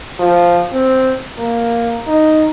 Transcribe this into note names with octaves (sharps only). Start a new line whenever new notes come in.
F3
C4
A#3
D#4